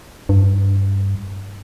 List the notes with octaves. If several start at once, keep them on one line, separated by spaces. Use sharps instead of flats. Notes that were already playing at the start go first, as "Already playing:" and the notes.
G2